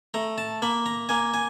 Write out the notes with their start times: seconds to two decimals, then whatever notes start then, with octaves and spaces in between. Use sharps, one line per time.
0.14 A3 A#5
0.38 A5
0.62 A#3 B5
0.86 A#5
1.09 A#3 G#5
1.34 G#5